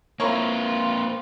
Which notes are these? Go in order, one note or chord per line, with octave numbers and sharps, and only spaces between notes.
A#3 C4 E4 F4 A#4 C#5 C6